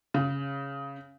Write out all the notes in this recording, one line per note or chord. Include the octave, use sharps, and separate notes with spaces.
C#3